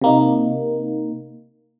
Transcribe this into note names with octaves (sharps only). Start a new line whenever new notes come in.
C3 A#3 D#4